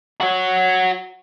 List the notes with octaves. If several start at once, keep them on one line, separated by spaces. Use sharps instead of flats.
F#4 C#5